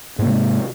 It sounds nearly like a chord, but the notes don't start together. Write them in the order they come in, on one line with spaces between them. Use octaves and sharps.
G#2 A#3 C3 G#3